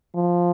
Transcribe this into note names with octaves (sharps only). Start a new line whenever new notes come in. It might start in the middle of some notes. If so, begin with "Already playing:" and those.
F3